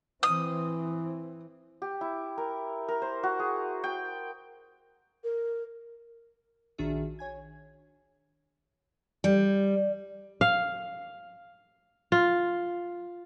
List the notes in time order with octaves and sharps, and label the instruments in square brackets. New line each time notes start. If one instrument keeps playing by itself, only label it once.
[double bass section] E3 C4 [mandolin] D#6
[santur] G4
E4
A#4
A#4
C5
F#4
G#4
G5
[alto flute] A#4
[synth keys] A#1 D#3 D4 F#4 G#4 E5
C#5 G#5 G#6
[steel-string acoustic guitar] G3
[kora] F5
F4